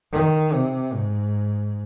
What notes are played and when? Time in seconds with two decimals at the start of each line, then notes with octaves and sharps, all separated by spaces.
0.12 D#3
0.53 C3
0.94 G#2